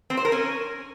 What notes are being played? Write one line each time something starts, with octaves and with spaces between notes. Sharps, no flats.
C4
C5
A#4
C#4